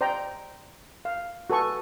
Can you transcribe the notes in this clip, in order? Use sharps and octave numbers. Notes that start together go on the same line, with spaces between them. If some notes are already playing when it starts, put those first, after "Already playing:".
C5 D5 G5 A#5
F5
F#4 A4 B4 G#5 C#6